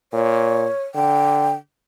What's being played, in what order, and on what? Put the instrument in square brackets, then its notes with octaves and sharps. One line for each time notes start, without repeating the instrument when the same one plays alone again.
[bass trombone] A#2 [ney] C#5
[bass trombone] D3 [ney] G5